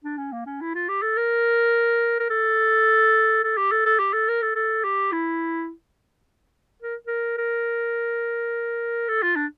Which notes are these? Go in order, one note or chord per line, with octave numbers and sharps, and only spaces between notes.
D4
C#4
A#3
C#4
E4
F4
G4
A4
A#4
A#4
A4
A4
G4
A4
A4
G4
A4
A#4
A4
A4
G4
E4
A#4
A#4
A#4
A4
F4
D4